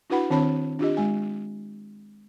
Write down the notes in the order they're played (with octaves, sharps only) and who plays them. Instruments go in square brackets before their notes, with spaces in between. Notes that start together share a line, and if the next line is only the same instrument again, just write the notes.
[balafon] D4 E4 F#4 B4 F#5 B5
D#3 C4 D4 C#5 A5 B5
D4 F4 G4 D#5
G#3 G#5